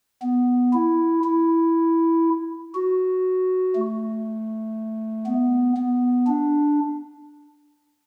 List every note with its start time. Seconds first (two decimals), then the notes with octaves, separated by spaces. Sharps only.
0.23 B3
0.73 E4
1.24 E4
2.75 F#4
3.75 A3
5.27 B3
5.77 B3
6.27 D4